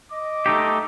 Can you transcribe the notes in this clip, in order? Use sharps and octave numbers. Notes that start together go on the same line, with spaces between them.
D#5 D6
A3 D#4 G4